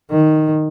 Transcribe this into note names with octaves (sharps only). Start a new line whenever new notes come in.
D#3